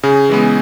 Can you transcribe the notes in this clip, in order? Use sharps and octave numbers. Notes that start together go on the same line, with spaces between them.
C#3 G#4
E3 G#3 B3